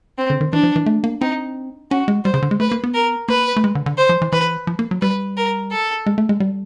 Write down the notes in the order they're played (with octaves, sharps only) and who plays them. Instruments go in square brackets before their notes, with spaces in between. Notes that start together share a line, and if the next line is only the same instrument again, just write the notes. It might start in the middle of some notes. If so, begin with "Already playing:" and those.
[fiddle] C4
[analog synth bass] D3
D#3
[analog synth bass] E3 [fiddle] D4
[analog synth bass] F3
E3
A3
A#3
[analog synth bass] C4 [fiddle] D#4
[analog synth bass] C#4 [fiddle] F#4
[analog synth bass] G#3
[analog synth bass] G3 [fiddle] C5
[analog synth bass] C#3
D3
G#3
[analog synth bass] A3 [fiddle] B4
[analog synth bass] A#3
B3
[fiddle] A#4
[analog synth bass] A#3 [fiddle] B4
[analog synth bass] A3
G#3
D3
D3
[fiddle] C5
[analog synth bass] F3
E3
[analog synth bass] E3 [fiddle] B4
[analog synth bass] F3
A#3
F#3
[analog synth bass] G3 [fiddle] B4
[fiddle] A#4
A4
[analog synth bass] G#3
A3
G#3
G3